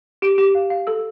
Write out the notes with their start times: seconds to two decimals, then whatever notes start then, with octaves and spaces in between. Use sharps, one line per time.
0.22 G4 D7
0.38 G4
0.55 F5
0.70 F5
0.87 A4 E6